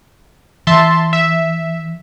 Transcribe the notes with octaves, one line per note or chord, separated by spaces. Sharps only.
E3 E5 A5 C6
E5